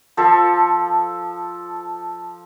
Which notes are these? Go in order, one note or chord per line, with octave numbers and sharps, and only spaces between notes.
F3 A4